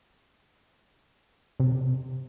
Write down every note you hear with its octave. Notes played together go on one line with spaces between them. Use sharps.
C3